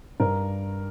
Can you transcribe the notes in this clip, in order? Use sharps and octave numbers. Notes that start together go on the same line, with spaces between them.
G2 A#4